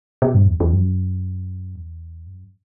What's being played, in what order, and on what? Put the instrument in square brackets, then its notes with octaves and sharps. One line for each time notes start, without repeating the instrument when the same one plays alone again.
[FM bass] B2
G2
E2
E2
F#2
E2
F#2